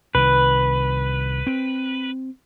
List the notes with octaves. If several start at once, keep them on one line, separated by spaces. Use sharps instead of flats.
C2 D#3 B4
C4